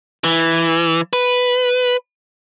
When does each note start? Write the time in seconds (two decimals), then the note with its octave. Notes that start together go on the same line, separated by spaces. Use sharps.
0.24 E3
1.13 B4